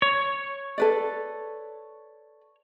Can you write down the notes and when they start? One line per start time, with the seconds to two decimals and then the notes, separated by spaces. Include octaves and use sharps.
0.02 C#5
0.78 A4 B4 D5